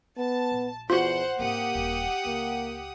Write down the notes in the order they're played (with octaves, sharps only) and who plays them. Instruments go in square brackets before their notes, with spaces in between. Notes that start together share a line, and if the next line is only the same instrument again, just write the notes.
[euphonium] B3 [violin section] A5
[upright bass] A#1
[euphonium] E2 [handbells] F4 F#4 [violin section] C5 F#5
[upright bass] G#2 C4 [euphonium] A#3 [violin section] G4 F#5 D#6
[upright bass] D#1 C4
[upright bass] C#2 [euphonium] A#3